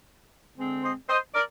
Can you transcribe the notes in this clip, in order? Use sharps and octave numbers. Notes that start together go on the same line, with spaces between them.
D3 G#3 C4
C5 D#5
C5 D#5
A#4 D5